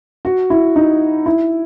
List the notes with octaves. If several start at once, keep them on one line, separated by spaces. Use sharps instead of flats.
F#4
E4
D#4
E4